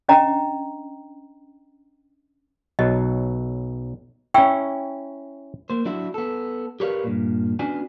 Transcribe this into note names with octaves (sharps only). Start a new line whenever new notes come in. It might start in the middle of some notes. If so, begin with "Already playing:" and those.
C#4 D4 D#5 G5 A#5
B1 F#3 D#5
C#4 E4 G5 C#6 E6
A#3 C5
F#3 D4 E4 F#4
B3 A4
G4 A#4 B4 C#5 D5 F5
G2 A#2
B3 C#4 D4 F#4 D5 G#5